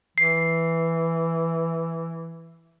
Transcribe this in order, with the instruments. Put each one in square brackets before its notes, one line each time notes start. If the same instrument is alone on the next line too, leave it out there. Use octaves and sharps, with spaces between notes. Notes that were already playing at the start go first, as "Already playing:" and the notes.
[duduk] E3 [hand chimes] C7